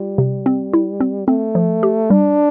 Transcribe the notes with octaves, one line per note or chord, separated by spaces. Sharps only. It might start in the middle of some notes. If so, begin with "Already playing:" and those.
Already playing: G3 F4
C3
C4
E4
C4
A3 C4
F3
G4
G3 D4